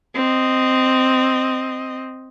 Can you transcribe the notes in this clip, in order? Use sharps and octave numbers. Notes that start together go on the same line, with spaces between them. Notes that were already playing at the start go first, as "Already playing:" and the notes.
C4 D#5